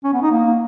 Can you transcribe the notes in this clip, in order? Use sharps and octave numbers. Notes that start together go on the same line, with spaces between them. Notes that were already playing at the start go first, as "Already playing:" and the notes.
C#4
B3
D#4
A#3